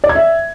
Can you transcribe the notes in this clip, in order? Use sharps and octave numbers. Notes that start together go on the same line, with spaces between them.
D5
G#6
E5